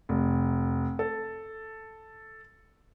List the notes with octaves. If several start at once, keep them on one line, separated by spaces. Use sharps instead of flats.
F1
A4